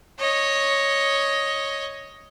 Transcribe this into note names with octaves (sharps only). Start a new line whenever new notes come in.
C#5 D#5